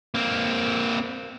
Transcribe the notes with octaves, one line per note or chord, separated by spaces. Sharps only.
A#3 C4